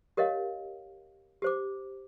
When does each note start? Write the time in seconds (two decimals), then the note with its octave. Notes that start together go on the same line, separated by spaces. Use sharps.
0.17 G4 A#4 C#5 D#5 F5
1.42 G4 C5 D6